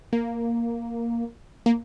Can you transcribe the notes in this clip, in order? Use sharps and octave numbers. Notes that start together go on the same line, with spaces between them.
A#3
A#3